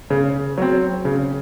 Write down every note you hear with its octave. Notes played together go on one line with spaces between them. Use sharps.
C#3
F#3 C4
C#3